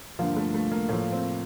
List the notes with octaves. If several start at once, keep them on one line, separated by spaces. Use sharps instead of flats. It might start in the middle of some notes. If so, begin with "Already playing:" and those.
G2 D3 F3 A#3
A3
A3
A#3
A2 F3 A#3
C4